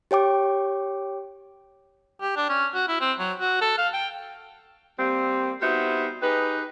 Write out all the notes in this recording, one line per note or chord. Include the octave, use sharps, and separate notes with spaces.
G4 C#5 G5 D6
G4
D4
C#4
F#4
E4
C4
F#3
F#4
A4
F5
G5
G3 A#3 C4
G3 B3 D#4 E4 F#4 C5
D#4 G4 G#4 B4